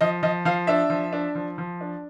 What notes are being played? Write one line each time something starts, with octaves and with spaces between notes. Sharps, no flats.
F3 D#5
F3 D#5
F3 F5
D4 E5
F3
D4
F3
F3
D4